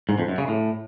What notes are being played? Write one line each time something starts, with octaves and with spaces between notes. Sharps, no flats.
G#2
F2
F#2
C#3
A2